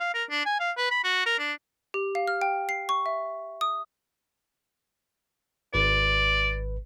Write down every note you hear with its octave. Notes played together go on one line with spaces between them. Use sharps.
F5
A#4
D4
G#5
F5
B4
B5
F#4
A#4
D4
G4
F5
F6
G5
C7
C#6
E5
D#6
G#1 B4 D5